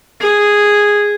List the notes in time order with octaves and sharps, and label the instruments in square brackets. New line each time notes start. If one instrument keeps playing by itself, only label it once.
[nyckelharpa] G#4